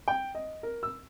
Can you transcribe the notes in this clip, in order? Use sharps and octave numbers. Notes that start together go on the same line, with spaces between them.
G5
D#5
A#4
E6